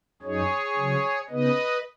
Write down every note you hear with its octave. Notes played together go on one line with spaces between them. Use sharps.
F#2 F#3 D#4 G#4 C#5
C#3 F#3 C#4
C#3 B3 D#4 B4 D#5